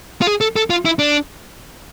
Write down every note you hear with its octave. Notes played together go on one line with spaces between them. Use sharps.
F4
G#4
A4
A4
F4
E4
D4